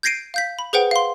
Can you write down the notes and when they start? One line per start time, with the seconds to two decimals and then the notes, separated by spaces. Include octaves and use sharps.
0.03 G6 G#6 A#6 C7 D7 D#7
0.34 F5 G6 B6
0.59 B5
0.73 G#4 B4 C5 F#5 G5
0.91 F5 C6